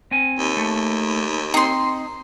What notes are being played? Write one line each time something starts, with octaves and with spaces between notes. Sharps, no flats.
C4 G#5
D#2
A3
C4 D#4 C6